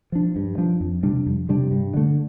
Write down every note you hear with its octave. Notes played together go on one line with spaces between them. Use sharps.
F3 D4
G2
F3 D4
F2
C3 G3 D4
F2
C3 G3 D4
G2
D3 A3